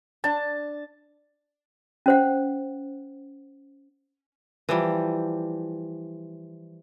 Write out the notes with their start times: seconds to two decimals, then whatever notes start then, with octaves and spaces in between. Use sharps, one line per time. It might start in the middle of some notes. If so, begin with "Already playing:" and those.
0.24 D4 A5
2.06 C#4 C5 F#5
4.69 E3 F3 G3